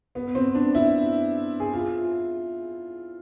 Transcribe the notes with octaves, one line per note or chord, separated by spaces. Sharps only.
B3
C4
D4
E4
G#4
F4